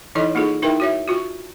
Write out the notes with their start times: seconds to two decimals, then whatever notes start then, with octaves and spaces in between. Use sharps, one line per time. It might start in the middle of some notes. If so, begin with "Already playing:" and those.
0.15 E3 D#4 E4 A4 C#5 D#5
0.35 A#3 D#4 F4 G#4 A4
0.62 D#4 E4 A#4 B4 E5 G5
0.80 F#4 C#5 E5
1.08 F4 F#4